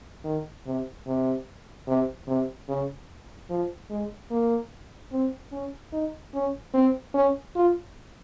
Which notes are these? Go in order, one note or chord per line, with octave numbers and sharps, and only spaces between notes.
D#3
C3
C3
C3
C3
C#3
F3
G#3
A#3
C4
C#4
D#4
C#4
C4
C#4
F4